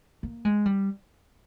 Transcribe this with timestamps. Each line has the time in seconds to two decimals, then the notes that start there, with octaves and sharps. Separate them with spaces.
0.23 A#3
0.45 G#3
0.65 G3